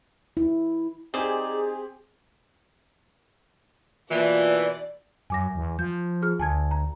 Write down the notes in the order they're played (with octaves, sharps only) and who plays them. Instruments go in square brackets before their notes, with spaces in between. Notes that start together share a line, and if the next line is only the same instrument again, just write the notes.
[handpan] E4
[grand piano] C4 G4 [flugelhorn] D#4 [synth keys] G#4 [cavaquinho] C5 D5
[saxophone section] B2 E3 [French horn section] A#3 F4 [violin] D5
[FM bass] F#2 [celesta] G#5 D6 A#6
[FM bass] E2
[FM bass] F3 [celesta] G6
[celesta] F4 G#4 F6
[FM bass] D2 [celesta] G#5 A5 G#6
[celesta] A#5